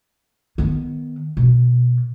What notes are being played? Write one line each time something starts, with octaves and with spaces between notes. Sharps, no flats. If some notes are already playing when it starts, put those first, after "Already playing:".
D#3 B3
B2